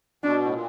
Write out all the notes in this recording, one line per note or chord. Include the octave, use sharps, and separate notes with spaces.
B2 D4
A2
A#2